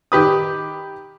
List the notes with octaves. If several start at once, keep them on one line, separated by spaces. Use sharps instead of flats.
D#3 G4 B4 D#6